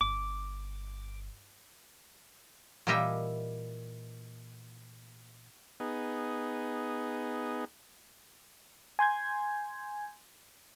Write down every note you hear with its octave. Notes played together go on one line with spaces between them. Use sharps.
G1 D6
A#2 E3 G3 G4 D#5 E5
B3 D#4 G#4
G#5 C6 G6 G#6